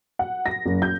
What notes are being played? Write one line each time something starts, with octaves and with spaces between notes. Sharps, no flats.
F#5
A#6
F#1
G6